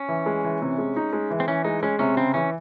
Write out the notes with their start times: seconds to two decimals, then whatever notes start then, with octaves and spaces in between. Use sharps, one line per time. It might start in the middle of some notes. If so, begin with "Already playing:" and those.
Already playing: C#4
0.09 E3
0.26 G#3
0.44 E3
0.62 C3
0.78 G#3
0.96 D#4
1.13 G#3
1.31 E3
1.40 C4
1.48 E3 C#4
1.64 G#3 D#4
1.83 G#3 C#4
1.99 C3 C#4
2.17 C#3 C4
2.34 E3 C#4